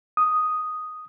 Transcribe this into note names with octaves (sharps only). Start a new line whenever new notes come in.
D#6